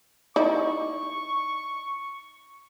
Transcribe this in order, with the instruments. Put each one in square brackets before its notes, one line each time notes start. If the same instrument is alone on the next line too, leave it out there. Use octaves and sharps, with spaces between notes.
[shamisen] D#4 E4 D5 [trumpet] C#6